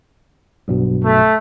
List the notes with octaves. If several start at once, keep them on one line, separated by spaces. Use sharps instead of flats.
B1 G2 B2
A3